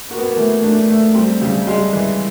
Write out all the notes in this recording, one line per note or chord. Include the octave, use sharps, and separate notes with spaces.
A#3 F#4
B3
A#3
E3 A3
A3 D4
A3
G3 C4
C#3 G3
G3 G#3
E3